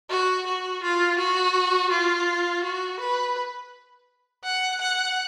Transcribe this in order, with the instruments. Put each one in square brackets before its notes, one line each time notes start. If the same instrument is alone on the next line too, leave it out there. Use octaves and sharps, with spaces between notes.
[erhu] F#4
F#4
F4
F#4
F4
F#4
B4
F#5
F#5